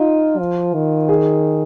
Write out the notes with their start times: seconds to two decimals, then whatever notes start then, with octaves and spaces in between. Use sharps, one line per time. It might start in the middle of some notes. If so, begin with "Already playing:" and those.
Already playing: D#4 F4
0.39 F3
0.74 D#3
1.09 G#4